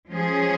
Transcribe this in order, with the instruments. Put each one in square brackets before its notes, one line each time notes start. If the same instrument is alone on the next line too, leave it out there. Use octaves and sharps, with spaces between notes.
[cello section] F3 G#3 C#4 G#4